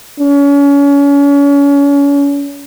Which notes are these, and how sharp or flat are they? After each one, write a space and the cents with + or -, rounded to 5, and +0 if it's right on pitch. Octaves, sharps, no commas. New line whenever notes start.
C#4 +35